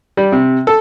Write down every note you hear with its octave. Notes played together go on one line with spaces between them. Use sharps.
G3
C3
A4